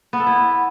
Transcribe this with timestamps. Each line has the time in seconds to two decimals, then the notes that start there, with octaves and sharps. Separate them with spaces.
0.13 B3
0.20 A4
0.27 E4